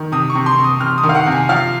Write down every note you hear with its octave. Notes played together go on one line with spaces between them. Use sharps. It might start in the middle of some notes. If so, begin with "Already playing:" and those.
Already playing: D#3
C3 D#6
C#6
C3
C6
C3
D#6
C3 F6
D#6
D#3
F5
F#5
C3
G#5
F3 F5